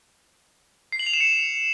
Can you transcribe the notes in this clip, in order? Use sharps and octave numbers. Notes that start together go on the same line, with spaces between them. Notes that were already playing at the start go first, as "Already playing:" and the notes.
C7
F#7
F7
E7
C#7